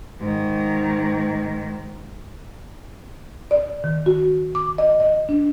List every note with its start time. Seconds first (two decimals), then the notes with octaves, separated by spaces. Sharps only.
0.20 G#2 D#3
3.51 D5
3.84 D#3
4.06 F#4
4.55 D6
4.78 D#5
5.00 D#5
5.29 D4